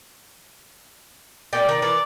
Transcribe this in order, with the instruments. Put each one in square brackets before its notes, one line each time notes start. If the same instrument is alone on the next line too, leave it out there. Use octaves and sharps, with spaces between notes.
[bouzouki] A#2 G5 [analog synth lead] D5
[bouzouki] D#3
[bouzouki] E3 A#4 [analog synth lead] D5